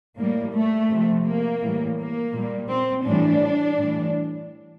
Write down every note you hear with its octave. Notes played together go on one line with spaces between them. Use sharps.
A2 G3 A#3
A3
C3 F3
A#3
A2 E3 G3
A#3
A#2 G3
C4
A2 E3 G3 D4
A2 E3 G3